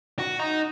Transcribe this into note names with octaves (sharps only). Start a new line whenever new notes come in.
F#4
D#4